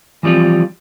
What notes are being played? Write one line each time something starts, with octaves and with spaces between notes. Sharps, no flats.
E3 F3 G3 C4 F4